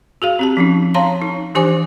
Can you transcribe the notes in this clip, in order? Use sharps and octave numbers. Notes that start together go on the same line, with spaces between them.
F#4 G#4 F5
C4 G4 A5
F3 C#4 D#4
C#5 F5 A5 A#5 C6
D#4
E3 D4 G4 C5 G#5 D6